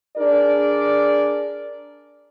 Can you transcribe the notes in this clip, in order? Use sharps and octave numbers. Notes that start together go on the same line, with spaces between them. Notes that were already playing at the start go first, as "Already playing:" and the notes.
D4 G#4 A#4 D5